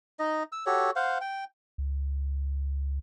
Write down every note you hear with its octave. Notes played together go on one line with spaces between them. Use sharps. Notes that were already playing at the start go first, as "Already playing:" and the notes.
D#4 D#5
E6
F#4 G4 A4 C#5
C5 F5 F#5
G5
C#2